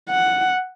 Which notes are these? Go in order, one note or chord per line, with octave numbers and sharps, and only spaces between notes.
F#5